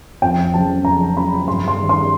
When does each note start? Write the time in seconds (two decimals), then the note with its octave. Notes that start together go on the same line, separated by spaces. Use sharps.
0.22 F2 G5
0.54 C#3 F#3 A5
0.85 F2 A#5
1.17 C#3 F#3 B5
1.48 G2 C6
1.68 C6
1.78 D#3 G3
1.89 C6